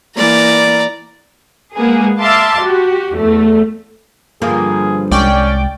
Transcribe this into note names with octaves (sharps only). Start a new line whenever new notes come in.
E3 A#3 D5 A#5
G#3 A#3 B3 G#4
E5 F5 A5 C6 D6
F#4 G4
E2 A3
G2 D3 F3 A#3 G#4
C2 G#3 C#4 D5 G5